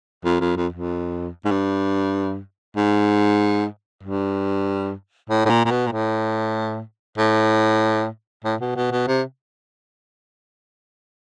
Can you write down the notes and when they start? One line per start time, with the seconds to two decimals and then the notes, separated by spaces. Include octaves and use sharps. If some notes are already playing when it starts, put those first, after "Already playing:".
0.25 F2
0.40 F2
0.56 F2
0.73 F2
1.45 G#2
1.51 G2
2.76 G#2
4.03 G2
5.30 A2
5.45 A2
5.50 A#2
5.65 A#2
5.71 B2
5.86 A#2
5.92 A2
7.18 A2
8.44 A2
8.61 B2
8.76 B2
8.91 B2
9.07 C3